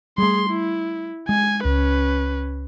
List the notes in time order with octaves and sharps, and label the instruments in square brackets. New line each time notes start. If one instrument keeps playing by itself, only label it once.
[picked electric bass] G3 A3 [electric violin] G#4 C6
[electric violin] E4
[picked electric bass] G#3 [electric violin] G#5
[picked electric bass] C#2 [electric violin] C#4 B4